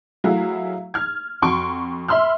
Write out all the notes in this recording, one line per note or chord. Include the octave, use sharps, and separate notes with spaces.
F#3 A3 E4 F#4 G#4 F5
F6 G#6
F2 F#4 C6 C#6 D7
E5 B5 C6 E6 F6